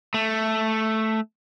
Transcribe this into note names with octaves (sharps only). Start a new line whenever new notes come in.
A3